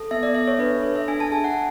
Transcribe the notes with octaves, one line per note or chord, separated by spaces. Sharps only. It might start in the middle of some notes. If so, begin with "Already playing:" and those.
Already playing: A4
B3 E5
D5
A4 E5
C#5
D4 B4
A4
E5
D4 G#5
A5
G#4 G#5
F#5